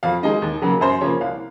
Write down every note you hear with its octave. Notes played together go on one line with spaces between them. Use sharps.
F2 F5
D#3 G#3 D#5
D#2
C#3 F#3 A#3
F#2 C5
C#3 F3 A#3 C#5
C2 F5